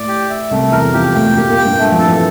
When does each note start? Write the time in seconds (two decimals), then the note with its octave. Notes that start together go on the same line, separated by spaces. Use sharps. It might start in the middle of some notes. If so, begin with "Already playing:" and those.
Already playing: A2 D5
0.08 G4
0.30 E5
0.50 C2 C3 A3
0.72 E2 E3 A#4
0.93 F2 F3 G4
1.14 A2 A3 G5
1.36 A#2 A#3 G4
1.50 A#2 A#3
1.58 G5
1.64 G2 G3
1.78 G2 G3 A3
1.92 F2 F3
1.99 A4
2.06 E3